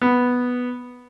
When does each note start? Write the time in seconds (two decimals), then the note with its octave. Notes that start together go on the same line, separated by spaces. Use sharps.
0.02 B3